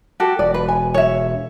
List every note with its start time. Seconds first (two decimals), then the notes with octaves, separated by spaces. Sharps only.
0.20 F#4 G4 A4
0.39 E1 D5
0.54 B4
0.68 G#5
0.94 C#5 E5